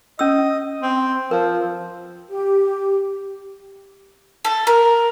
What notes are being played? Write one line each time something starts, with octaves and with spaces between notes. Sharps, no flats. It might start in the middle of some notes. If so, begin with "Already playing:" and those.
C#4 D#5 E6
C4
F3 A#4
G4
A4
A#4